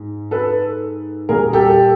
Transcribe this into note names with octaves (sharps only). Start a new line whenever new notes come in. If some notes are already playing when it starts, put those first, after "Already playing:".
Already playing: G#2
A4 B4
A#2 G3 G#4 A#4
G4 A4